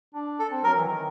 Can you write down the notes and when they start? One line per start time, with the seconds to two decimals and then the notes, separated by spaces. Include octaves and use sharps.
0.15 D4
0.39 A4
0.51 C4
0.64 F#3 A#4
0.76 E3
0.88 D#3